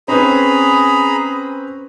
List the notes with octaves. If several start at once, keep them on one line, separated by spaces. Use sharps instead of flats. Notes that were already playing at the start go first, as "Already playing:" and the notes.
C4 C#4 G#4 B4 A#5 B5